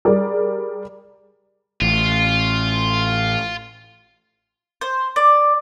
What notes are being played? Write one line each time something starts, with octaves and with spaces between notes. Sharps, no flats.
G3 G#4 A#4 D5
A1 F4
C5
D5